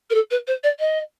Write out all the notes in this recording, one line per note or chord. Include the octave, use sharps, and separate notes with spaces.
A#4
A4
B4
C5
D5
D#5